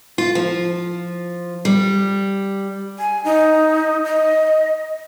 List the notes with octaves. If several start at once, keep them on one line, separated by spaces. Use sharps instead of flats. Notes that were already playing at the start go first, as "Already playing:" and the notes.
F4
F3
G3
G#5
D#4
D#5